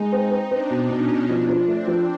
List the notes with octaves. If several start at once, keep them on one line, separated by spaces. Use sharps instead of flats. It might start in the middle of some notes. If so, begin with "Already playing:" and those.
Already playing: G#3 D#4
C4 D#4
C4
C4 D4
B2
B2 C#4
B2
F3 D4
F3
A3 C4
F3